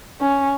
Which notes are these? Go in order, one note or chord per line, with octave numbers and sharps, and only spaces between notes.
C#4